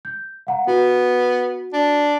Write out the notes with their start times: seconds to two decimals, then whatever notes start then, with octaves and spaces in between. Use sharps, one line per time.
0.05 G6
0.47 F5 F#5 A#5
0.67 B3 F#4
1.73 D4